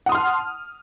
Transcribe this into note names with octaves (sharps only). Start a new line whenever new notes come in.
F#5 A5 C6 D#6 F6